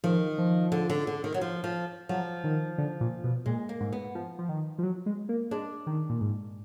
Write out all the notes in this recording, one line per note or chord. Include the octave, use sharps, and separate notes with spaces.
D#3 F3
F3
D3
D3
D3
D#3
F#3
F3
F3
F3 F#3
D#3
D3
A#2
B2
A#2 G#3
A#3
G#2
B3
F3
F3
D#3
F3
F#3
G#3
A#3
G#3 D4
D#3
A#2
G#2